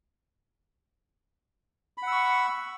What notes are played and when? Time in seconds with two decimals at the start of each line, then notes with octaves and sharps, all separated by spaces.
1.98 B5
2.02 F#5
2.07 E6
2.12 C#6